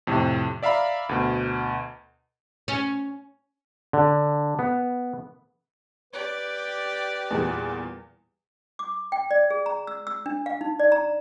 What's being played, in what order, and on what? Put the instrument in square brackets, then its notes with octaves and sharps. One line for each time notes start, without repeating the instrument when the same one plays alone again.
[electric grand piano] F2 A2 C3
D5 E5 F5 A#5 B5
D2 B2
[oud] C#4
[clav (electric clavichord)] D3
B3
[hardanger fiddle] G4 D5 [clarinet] B4
[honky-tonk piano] E2 A#2 G3
[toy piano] D6
G5
D5
G#4
A#5
E6
E6
D4
F5
D#4
D5
A#5